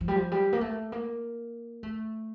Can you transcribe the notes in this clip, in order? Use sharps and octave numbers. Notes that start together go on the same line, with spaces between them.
F3
G3
F3
G3
A#3
A3
A#3
A3